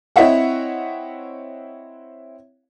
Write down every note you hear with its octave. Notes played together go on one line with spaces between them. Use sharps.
C4 E4 C#5 D#5 E5 F#5